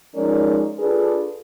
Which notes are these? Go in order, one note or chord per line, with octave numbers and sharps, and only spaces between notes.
F3 G#3 C#4 D#4 A#4 D5
D4 F4 G#4 A4 B4 D5